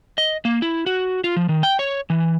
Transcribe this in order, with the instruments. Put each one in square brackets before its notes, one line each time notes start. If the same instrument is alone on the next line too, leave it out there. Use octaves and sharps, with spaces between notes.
[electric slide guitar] D#5
A#3
E4
F#4
F4
F3
D#3
G5
C#5
E3